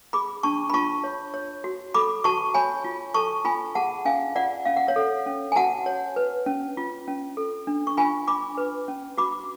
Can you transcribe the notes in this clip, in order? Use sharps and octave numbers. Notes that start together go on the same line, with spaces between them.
G#4 B5 D6
D4 A5 C#6
B5
F4 A5 C#6
C#5
C#5
F#4
A4 B5 D6
F#4 A5 C#6
C#5 G#5 B5
F4
A4 A5 C#6
F4 G#5 B5
G#4 F#5 A5
C#4 F5 G#5
F4 D5 F#5
C#4 F5
F#5
C#5 F5
A4
C#4
G#5
F#4 F#5 A5
C#5
B4
C#4
F4
C#4
A4
D4
C#6
F4 G#5 B5
D4 B5 D6
B4
C#4
F#4 B5 D6